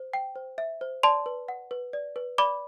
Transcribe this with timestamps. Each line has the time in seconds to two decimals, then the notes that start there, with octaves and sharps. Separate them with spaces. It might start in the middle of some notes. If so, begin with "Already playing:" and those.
Already playing: C5
0.13 G5
0.36 C5
0.58 E5
0.81 C5
1.03 D5 A5 C6
1.26 B4
1.48 F#5
1.71 B4
1.93 D5
2.16 B4
2.38 D5 B5 D6